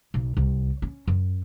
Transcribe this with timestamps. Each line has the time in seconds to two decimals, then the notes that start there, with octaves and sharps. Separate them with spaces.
0.14 B1
0.37 C2
0.82 C#4
1.07 F#2